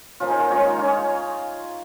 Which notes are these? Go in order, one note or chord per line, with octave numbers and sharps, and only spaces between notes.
C#3 F3 A#3 F4
D#4 G#4
F4 A#4
D#3 G#3 C#4 G#4 C#5
C#4 C#5 F5